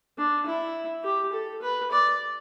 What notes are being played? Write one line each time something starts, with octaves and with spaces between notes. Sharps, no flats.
D4
E4
G4
A4
B4
D5